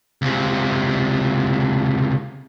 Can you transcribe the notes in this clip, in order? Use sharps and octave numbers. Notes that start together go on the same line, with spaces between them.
C#2 C3